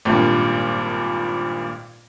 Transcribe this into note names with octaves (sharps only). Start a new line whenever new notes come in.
G#1 G2 A#2